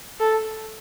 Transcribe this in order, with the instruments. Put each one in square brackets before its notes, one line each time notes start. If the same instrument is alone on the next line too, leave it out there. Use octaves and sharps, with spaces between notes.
[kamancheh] A4